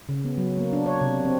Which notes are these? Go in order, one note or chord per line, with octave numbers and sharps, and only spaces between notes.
C#3
B3
F#3
A#3
D4
C#5
C3
C4